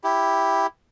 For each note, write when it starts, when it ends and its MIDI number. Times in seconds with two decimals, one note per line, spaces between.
0.04 0.67 64
0.04 0.67 67